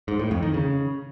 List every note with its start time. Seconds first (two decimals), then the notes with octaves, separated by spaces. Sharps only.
0.08 G#2
0.19 A2
0.31 F2
0.42 D#3
0.54 C#3